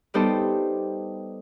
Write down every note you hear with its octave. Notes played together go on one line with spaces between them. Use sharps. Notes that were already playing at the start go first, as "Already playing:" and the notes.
G3 B3 D#4 G4 A4 C5